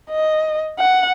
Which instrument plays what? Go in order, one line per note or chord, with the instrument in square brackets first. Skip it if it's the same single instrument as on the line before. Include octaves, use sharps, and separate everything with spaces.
[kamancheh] D#5
F#5